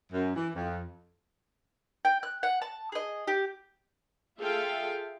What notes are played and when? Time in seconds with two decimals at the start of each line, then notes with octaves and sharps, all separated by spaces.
0.12 F#2
0.35 E3
0.54 F2
2.05 G5
2.23 F#6
2.43 F#5
2.62 A5
2.92 G#4 D#5
3.28 G4
4.40 F4 G#4 A4 E5 F5 G5